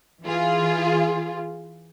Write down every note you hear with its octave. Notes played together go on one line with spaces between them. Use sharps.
E3 F4 G#4